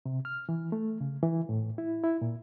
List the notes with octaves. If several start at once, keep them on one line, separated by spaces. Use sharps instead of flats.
C3
F6
E3
A3
C#3
E3
A2
E4
E4
A#2